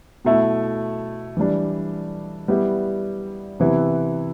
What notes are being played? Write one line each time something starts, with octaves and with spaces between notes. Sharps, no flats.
B2 A3 E4
E3 G3 D4
G3 B3 E4 G4
C3 E3 B3 E4